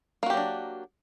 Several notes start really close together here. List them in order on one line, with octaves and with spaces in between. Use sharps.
A#3 F#4 G4 F#3 D4